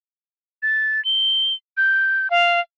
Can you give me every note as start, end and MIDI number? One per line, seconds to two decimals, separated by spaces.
0.63 1.03 93
1.05 1.53 103
1.77 2.30 91
2.30 2.60 77